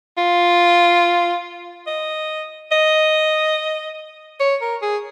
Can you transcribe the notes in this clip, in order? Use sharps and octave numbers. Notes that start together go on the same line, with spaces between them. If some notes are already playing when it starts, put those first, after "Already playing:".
F4
D#5
D#5
C#5
A#4
G#4